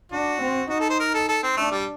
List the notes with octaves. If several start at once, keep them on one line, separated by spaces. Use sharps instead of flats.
D4 F#4
C4
D#4 F#4
A4
C5
A#4
A4
A4
C4
A3 D4
G3